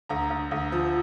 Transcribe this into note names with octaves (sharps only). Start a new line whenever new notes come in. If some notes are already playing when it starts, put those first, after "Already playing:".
D2 A#5
D2
D2
F3